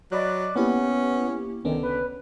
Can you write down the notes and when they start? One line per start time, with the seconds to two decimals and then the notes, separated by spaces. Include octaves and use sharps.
0.12 F#3 D5 D#5 B5 F#6
0.56 A#3 B3 C#4 E4 G4
1.64 C2 D3 D#3 B3 C#4
1.83 B4